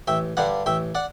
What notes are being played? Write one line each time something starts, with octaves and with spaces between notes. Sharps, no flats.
A1 E5 G5
G2 D3 G3 D5 F#5
A1 E5 G5
D5 F#5